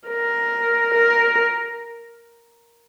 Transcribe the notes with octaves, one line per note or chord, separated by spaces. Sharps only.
A#4
A#4